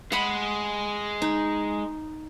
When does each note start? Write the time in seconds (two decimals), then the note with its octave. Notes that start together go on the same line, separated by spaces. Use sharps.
0.12 G#3 F#5 B5 C6
1.22 D#4